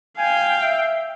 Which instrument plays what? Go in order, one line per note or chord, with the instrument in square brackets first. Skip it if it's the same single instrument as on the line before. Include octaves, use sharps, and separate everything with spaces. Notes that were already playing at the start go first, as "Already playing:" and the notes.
[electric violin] F5 G5 [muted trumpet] G#5
[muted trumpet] E5